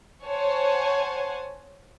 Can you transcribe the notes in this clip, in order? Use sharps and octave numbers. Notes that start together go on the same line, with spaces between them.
C5 C#5 F#5 G#5 A5